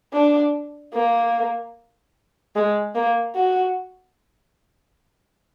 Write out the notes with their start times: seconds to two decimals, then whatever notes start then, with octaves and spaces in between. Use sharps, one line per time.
0.13 D4
0.94 A#3
2.55 G#3
2.95 A#3
3.35 F#4